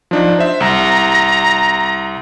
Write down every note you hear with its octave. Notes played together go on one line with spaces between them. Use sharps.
F3 D4 D#4
C5 E5
C2 A#5